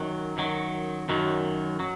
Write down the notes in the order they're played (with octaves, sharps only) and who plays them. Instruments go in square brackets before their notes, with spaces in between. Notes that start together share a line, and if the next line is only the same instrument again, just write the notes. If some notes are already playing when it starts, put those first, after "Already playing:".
Already playing: [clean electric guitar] F#2 D#3 F#3
F#2 D#3 F#3
F#2 D#3 F#3
F#3